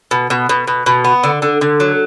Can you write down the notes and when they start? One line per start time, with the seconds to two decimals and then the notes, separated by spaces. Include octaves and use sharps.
0.11 B2
0.30 B2
0.49 B2
0.67 B2
0.86 B2
1.05 B3
1.24 D3
1.42 D3
1.61 D3
1.80 F#3